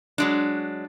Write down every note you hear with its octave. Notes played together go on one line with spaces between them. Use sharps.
F#3 G#3 D4